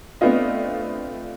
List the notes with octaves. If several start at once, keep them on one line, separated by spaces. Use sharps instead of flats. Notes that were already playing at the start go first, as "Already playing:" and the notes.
A3 B3 C4 D4 F4 D#5